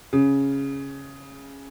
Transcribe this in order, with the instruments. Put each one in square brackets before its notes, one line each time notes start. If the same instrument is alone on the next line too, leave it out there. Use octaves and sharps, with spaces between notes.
[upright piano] C#3